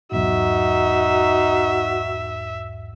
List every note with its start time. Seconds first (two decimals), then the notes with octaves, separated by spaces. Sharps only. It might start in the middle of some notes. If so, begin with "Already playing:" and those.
0.12 B1 E2 G#2 D#4 F#4 E5